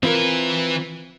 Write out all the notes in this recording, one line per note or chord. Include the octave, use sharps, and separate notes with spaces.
E3 C4 F4 A#4 B4